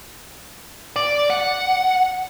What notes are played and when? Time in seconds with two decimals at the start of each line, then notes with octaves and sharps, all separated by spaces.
0.96 D5
1.30 F#5